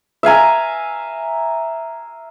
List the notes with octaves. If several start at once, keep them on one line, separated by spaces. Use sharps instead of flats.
E5 F5 G#5 A#5